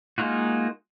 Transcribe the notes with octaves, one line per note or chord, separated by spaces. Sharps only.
G#3 A#3 D#4 F4 F#4